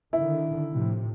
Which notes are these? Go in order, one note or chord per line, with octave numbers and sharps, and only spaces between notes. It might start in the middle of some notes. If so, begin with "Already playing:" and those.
D3 D#3 E4
A2 C3 F3